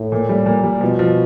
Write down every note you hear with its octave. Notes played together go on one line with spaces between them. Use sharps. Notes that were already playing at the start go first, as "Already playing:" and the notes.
Already playing: A2
A#2
G3
A#2
G3
B2 F3
F3